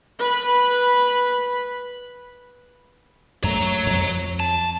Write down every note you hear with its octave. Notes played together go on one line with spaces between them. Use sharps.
B4 B5
F#2 A3 C#5 A#5
F2
A5